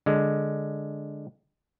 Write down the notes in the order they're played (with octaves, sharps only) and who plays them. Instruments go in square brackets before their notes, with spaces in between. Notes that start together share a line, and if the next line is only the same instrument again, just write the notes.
[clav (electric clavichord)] D3 G#3